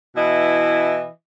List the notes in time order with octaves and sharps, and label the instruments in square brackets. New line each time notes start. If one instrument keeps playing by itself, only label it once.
[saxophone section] B2 E3 E4 D#5